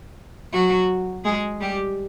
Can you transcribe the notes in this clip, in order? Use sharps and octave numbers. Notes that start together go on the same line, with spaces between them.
F#3 F#4
G#3 G#4
G3 G4